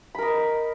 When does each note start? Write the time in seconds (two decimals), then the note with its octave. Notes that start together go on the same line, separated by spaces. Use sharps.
0.15 B5
0.18 A#4
0.22 D#5